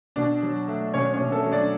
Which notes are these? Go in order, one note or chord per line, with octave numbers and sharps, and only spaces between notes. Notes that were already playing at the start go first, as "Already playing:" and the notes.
B2 D4 D5
F#3
A3
B2 C#4 C#5
C#4 C#5
B2
A3 A4
F#3
D4 D5